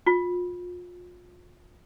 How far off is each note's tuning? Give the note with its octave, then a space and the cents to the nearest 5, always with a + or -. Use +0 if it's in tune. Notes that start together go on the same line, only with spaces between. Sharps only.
F4 +35